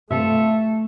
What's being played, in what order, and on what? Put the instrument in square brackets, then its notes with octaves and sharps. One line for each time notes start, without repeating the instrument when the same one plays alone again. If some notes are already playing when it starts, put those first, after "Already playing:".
[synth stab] G2 C3 [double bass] A3 [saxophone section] F4 A4 E5